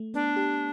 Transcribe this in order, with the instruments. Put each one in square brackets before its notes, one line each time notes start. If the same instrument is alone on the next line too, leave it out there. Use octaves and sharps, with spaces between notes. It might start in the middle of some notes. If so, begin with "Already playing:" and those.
Already playing: [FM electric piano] A3
[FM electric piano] B3 [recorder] D4
[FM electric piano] G4